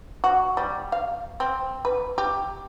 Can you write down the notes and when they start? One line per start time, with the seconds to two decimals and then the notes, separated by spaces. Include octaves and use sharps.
0.24 F#4
0.57 G3
0.92 F5
1.40 C4
1.85 B4
2.18 G4